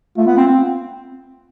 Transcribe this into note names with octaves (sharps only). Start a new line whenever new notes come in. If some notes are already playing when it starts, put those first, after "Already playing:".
A3 F4
B3
C4
C4